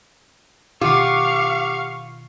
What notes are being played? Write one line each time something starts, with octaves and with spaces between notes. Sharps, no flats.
B2 D#3 F4 G4 F5 F#5 C#6 D6